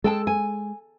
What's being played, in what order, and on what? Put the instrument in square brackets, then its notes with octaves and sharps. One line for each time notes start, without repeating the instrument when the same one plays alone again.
[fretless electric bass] G#3 [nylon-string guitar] A4 G5 A5
[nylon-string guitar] G#5